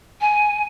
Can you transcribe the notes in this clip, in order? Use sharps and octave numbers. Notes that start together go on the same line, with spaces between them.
G#5